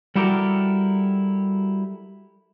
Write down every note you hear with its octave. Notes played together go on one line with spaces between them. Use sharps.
G3 E4 F#4 G4 A4 A#4